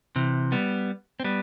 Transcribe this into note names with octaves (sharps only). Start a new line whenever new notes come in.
C3 E3
G3 B3
C4
G3 B3